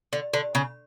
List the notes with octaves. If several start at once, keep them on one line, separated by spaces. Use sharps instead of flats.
D3
D3
C#3